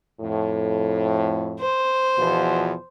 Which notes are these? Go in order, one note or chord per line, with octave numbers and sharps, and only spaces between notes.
F2 A2
C5
E2 B2 F3